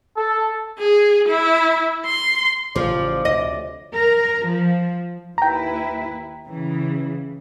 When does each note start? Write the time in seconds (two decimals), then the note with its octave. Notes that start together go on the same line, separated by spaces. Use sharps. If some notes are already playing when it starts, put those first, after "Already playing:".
0.16 A4
0.79 G#4
1.28 E4
2.06 C6
2.76 A1 C#3 F3 D5
3.25 D2 C3 D#5
3.94 A#4
4.48 F3
5.38 D#2 E4 B4 G5 A#5
6.47 C#3 E3